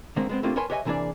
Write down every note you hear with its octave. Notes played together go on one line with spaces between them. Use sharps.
D3 D#3 G#3 A#3 C4
G#3 B3 C4
A3 A#3 C4 D4 F4 G4
A#4 B4 C#5 G#5 A5 C6
G4 B4 C#5 D#5 E5 G#5
C3 E3 A#3 D4 G#4 D5